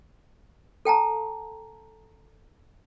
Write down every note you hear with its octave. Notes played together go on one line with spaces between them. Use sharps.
A4 G5 A5 A#5